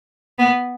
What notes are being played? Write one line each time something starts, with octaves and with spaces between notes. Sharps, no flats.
B3